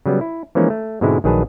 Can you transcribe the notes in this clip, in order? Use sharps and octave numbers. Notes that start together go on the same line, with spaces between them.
C#3 F#3 G3 B3
E4
E3 F3 G#3 A#3 C#4 D#4
A3
G#2 B2 D3 G#3 C4 E4
A#1 D#3 F#3 G#4 B4 A5